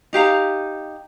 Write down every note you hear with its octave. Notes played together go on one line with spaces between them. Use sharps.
D#4 G4 F5 A#5